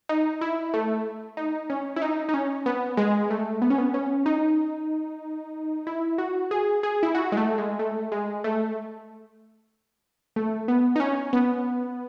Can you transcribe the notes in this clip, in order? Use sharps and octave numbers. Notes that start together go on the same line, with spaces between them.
D#4
E4
A3
D#4
C#4
E4
D#4
D#4
C#4
B3
G#3
A3
B3
C#4
B3
C#4
D#4
E4
F#4
G#4
G#4
E4
F#4
G#3
A3
G#3
A3
G#3
A3
A3
B3
D#4
C#4
B3